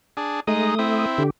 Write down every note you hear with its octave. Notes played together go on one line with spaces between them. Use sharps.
D4 G#4
G#3 A3 D#4 D#6
C4 E4
D3 G4